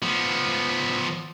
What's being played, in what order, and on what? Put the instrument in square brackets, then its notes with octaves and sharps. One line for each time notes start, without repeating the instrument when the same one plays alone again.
[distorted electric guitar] F3 B3